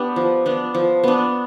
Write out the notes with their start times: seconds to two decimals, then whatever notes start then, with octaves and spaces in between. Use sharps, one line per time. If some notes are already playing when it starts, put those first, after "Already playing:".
Already playing: B3 D4 G4
0.16 F3
0.46 B3 D4
0.74 F3
1.04 B3 D4